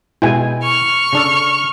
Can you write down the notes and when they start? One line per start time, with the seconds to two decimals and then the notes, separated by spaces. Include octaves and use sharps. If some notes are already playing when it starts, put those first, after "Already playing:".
0.22 B2 G#3 E4 G5 G#5
0.63 C#6 F6
1.13 C#3 D4 A4